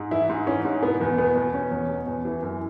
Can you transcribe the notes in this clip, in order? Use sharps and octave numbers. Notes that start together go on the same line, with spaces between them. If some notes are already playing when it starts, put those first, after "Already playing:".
Already playing: G#2
E3 E4
G#2
E3 C#4
G#2
B2 B3
E2
B2 B3
E2
B2 C#4
E2
B2
E2
E3
F#2